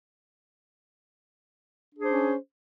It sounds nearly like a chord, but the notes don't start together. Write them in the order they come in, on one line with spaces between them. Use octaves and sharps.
D4 G#4 C5 C#4